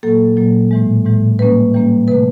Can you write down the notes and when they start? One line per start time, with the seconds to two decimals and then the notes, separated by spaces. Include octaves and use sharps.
0.03 A#2 F#3 A#3 A4
0.37 A#2 F#3 A#3
0.71 A2 E3 G#3
1.05 A2 E3 G#3
1.39 E3 G3 A#3 C#4 B4
1.74 E3 G3 A#3 C#4
2.08 C3 E3 A3 B4